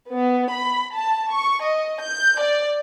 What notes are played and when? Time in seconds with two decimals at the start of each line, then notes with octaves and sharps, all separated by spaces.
0.12 B3
0.50 B5
0.93 A5
1.31 C#6
1.64 D#5
2.02 G6
2.40 D5